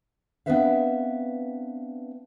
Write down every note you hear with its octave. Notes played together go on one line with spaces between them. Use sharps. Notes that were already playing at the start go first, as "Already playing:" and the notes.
B3 C4 D4 B4 E5 F5